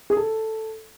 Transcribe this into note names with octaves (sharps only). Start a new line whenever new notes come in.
G#4
A4